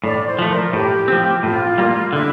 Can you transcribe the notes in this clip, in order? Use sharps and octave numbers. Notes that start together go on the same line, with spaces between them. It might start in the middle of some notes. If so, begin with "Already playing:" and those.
A2 D5
C5
F3 A3
A#4
A2 G4
F3 C4
A2 F4
G3 A#3
D3 E4